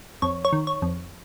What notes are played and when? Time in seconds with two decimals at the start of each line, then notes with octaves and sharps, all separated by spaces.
0.22 F2 C#5
0.45 C#5
0.53 D#3
0.67 C#5
0.82 F2